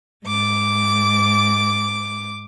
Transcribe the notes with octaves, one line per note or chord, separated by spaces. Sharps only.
G#2 D6